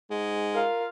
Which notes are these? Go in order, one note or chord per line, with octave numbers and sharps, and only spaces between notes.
G#2 G#3
F4 A#4 F5